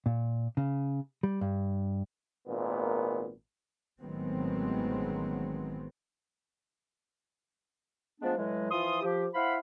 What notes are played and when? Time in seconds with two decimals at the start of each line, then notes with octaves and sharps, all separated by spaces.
0.06 A#2
0.57 C#3
1.23 G3
1.41 G2
2.46 G#1 A#2 A#3 B3
4.00 A1 D#3 F#3 G#3 B3 C4
8.20 F3 G#3 A3 B3 D4
8.37 A2 E3 F#3 G#3
8.71 E3 F3 F4 C6 D#6
9.02 F3 G4
9.34 E4 C5 F5 F#5 B5